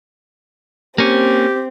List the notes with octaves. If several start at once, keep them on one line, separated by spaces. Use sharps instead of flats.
A#3 C4 C#4 G4